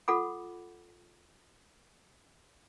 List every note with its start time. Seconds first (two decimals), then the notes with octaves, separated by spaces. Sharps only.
0.08 F4 A4 F#5 B5 D6